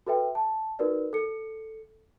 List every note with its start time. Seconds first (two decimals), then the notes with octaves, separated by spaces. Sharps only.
0.06 F#4 A4 B4 E5 G5
0.35 A5
0.79 D#4 F#4 A#4 B4 D5
1.13 A4 C#7